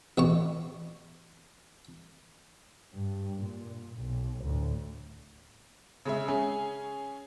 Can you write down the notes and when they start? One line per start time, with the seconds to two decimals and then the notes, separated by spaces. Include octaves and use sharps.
0.18 A1 B2 C#6
2.95 G2
3.42 A#2
4.01 B1
4.44 D2 A2
6.05 C#3 G#3 E5
6.28 C#4 G#4